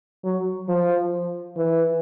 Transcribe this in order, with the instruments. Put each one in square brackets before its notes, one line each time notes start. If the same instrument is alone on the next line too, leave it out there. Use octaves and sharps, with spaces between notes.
[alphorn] F#3
F3
E3